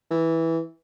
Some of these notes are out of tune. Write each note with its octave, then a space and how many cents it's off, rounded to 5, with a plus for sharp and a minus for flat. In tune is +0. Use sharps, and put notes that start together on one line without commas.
E3 -10